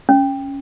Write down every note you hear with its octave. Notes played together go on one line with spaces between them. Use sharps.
C#4